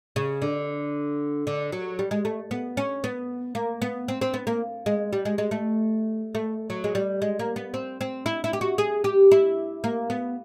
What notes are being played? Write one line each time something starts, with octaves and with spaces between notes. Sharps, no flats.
C#3
D3
D3
F#3
G3
G#3
A3
B3
C#4
B3
A#3
B3
C4
C4
B3
A#3
G#3
G3
G#3
G#3
A3
A3
F#3
G#3
G3
G#3
A#3
B3
C4
C4
E4
E4
G4
F#4
G#4
G4
E4
A#3
B3